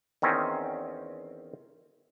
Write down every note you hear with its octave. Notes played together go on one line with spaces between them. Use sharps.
E2 D#3 C4 C#4